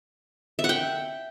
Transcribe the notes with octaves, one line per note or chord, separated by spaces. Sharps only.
E5
F#5
G5